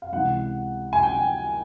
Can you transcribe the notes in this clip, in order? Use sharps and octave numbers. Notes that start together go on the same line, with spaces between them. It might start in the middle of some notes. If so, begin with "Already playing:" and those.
F5
C#2 C3 E3 F#5
G#5
G5